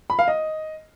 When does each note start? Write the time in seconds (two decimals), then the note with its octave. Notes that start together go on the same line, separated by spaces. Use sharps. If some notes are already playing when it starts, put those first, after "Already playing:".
0.10 B5
0.19 F5
0.28 D#5